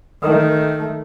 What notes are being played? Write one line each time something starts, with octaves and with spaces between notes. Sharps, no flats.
D#3 A3